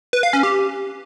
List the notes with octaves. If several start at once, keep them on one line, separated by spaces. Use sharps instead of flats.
B4
F5
C#4
G4